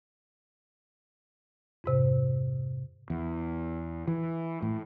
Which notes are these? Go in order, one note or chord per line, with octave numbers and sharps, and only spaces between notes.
F2 G#2 C3
E2
E3
A2